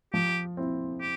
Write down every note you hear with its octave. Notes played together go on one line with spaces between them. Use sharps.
F3 G4
C4 E4
G4